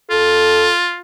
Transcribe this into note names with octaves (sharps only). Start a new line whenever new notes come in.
F4 A4